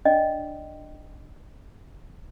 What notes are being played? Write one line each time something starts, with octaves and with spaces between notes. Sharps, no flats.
D4 D5 D#5 G5